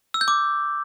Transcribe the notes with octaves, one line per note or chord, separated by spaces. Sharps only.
E6
G6
D6